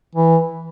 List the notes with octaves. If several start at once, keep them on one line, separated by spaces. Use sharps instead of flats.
E3